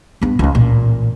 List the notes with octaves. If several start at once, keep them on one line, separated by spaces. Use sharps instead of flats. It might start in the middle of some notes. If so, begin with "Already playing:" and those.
G2 B3
C#2 F3
A1 A#2